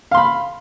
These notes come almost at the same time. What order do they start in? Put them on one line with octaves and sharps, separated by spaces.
F5 C6 B5